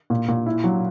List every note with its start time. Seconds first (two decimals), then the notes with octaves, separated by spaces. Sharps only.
0.10 A#2
0.28 A#2
0.46 E4
0.64 F#3